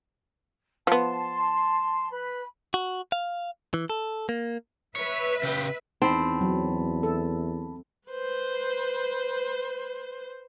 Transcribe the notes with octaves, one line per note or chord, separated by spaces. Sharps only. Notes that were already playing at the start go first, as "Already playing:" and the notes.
F3 B3 A5 C6
B4 B5
F#4
F5
E3
A4
A#3
B4 C#5 E5
C#3 G4
E2 C4 D#4 A5 B5
F#3
A4
B4 C5